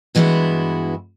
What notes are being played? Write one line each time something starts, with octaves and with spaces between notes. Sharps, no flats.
G2 E3 G#3 B3 E4 F#4